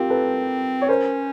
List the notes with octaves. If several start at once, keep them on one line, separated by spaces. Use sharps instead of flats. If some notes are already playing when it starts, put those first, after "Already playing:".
Already playing: C4 F4 G4 A#4
A4 B4
C#5
C#4 A#4 C5